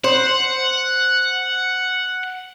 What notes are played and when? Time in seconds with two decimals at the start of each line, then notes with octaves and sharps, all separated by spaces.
0.04 C5 F#5